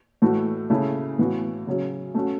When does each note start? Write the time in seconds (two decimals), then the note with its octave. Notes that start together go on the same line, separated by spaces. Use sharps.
0.22 A2 E3 A3 F#4
0.70 C#3 A3 E4
1.18 A2 E3 B3 F#4
1.67 C#3 F#3 C#4
2.14 A3 C#4 F#4